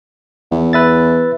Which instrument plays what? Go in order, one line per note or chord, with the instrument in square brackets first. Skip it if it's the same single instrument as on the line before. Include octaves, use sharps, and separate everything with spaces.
[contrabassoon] E2
[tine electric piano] B4 E5 A6